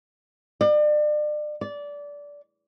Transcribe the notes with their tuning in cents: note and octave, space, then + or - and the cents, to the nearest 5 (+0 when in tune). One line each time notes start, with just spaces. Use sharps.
D5 +35
D5 -20